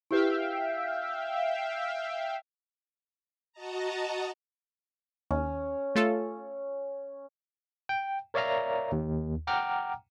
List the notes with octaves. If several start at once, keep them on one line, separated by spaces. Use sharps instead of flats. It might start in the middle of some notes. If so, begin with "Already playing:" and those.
E4 G4 B4 E5 F5 G5
F#4 D#5 A5 A#5
D#2 C#4
A3 F4 A4
G5
A#4 C#5 D5 E5 F5 A#5
D#2
F#5 G5 A#5 D6 F6